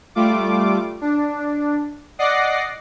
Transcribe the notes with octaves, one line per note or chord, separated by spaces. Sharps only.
G3 A3 F4 D6
D4
D5 D#5 F#5 D6 A#6 C7